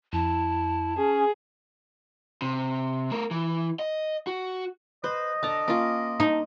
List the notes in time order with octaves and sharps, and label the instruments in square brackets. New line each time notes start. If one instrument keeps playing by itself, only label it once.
[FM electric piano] F2 [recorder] E4 [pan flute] A5
[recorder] C#4 [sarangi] G#4
[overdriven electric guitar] C3
A3 A#4
E3
D#5
F#4
[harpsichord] B4 [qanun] C5 [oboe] D#5
[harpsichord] D3 [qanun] A5 A#5
[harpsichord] A#3 [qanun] C#4 F4
[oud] D#4